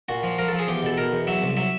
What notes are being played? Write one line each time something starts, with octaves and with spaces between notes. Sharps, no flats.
A#2 F#4
F3
F3 A#4
A4
F3
G#4
E2 G4
B2 A4
B2 A#4
E2
F#3 E5
C2
F#3 E5